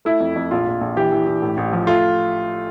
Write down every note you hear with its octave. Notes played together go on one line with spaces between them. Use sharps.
A3 E4
F2
F2
A#1 F4
A#1
A#1
E3 G4
E3
E3
A2
A1
F3
A3 F4